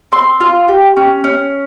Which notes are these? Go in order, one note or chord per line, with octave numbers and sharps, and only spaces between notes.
C4 C6
F4
G4
C#4
C#4